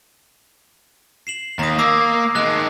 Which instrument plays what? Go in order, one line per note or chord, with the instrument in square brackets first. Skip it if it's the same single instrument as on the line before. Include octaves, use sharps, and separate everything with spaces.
[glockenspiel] C7 E7 F#7
[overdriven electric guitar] D#2 [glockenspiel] A#5 D#6
[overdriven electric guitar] A#3 [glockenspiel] D6 E6 C7
[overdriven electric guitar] D#3 G#3 [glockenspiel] F#6